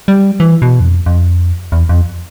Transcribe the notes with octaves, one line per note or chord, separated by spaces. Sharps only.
G3
E3
B2
E2
F2
F2
E2
F2